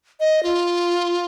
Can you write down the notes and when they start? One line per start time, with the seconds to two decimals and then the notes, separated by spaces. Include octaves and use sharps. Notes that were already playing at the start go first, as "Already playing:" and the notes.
0.20 D#5
0.43 F4